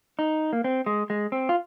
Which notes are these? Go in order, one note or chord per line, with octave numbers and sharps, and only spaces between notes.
D#4
A#3
C4
G#3
G#3
C4
F4